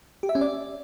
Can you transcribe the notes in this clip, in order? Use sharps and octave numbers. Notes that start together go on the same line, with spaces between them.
G4
E5
C#4
D5